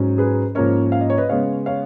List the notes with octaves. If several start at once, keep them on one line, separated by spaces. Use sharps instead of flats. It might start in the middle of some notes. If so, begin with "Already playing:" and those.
Already playing: G#2 F#3 C#4
G#4 B4
G#2 F3 A#3 C#4 A#4 C#5
F5
D#5
C#5
B4 D#5
C#3 G#3 B3 C#5 F5
C#5 F5